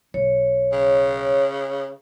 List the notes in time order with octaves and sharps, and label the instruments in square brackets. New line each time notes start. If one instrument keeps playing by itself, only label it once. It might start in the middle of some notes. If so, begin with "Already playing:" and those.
[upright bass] B1 [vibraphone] C#5
[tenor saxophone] C#3